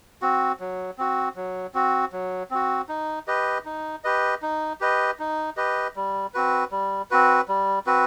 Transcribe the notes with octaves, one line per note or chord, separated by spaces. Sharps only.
C4 F#4
F#3
C4 F#4
F#3
C4 F#4
F#3
C4 F#4
D#4
G4 B4 D#5
D#4
G4 B4 D#5
D#4
G4 B4 D#5
D#4
G4 B4 D#5
G3
C4 F#4 B4
G3
C4 F#4 B4
G3
C4 F#4 B4